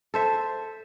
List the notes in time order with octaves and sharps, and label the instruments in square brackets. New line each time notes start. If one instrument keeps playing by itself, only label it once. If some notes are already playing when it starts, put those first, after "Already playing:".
[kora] A4 C5 E5